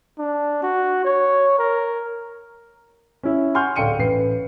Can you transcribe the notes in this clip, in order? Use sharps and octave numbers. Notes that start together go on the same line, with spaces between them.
D4
F#4
C#5
A#4
C#4 E4
F#5 G#5 C6 C#6 F6 G6
D1 D3 F5 G5 C#7 D#7
A1 B4 C7